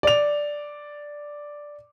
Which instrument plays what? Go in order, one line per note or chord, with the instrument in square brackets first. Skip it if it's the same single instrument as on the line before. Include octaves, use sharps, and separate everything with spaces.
[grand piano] D5 F7